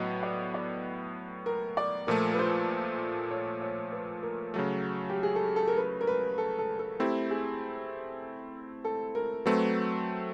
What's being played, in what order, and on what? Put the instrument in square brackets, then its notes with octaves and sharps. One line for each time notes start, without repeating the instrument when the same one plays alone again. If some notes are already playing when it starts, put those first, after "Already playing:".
Already playing: [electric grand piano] A2 F#3 B3 [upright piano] D#5
[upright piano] D5
D5
A#4
D5
[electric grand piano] A#2 F3 A3 [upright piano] A#4
[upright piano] B4
C5
C#5
C#5
B4
A#4
[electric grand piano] C#3 F#3 A3
[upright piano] G4
G#4
A4
A4
A#4
B4
A#4
B4
A4
A4
A4
[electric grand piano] A3 C4 E4 [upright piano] G4
[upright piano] G#4
A4
A#4
[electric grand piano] F#3 A3 C4 [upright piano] B4